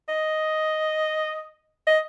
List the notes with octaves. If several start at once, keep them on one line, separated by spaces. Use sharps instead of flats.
D#5
D#5